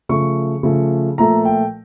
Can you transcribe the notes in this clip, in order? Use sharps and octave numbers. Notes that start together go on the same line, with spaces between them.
C#3 F3 A3 C#6
C#3 F3 A3
A#2 F3 A3 A#5
G5